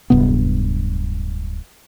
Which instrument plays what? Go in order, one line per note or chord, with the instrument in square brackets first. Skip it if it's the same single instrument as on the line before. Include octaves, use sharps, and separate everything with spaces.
[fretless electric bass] D1 G2 C3 B3